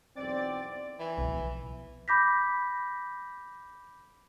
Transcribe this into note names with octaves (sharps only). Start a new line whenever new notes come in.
B1 E2 C4 D5
E3
B1 F3
B5 D6 G6 A#6 B6